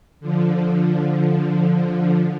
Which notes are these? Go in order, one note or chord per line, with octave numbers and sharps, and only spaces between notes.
D3 F3